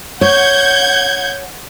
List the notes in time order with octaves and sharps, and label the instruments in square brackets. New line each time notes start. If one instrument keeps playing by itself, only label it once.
[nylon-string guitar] C#5 [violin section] F#5 G6 G#6